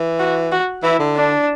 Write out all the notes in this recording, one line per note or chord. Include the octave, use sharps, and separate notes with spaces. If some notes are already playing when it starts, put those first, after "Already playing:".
Already playing: E3
F#4
F#4
E3 E4
D3
D4